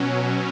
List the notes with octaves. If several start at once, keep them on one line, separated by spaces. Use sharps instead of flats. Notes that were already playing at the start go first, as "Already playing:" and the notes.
Already playing: B2 F#3 C#4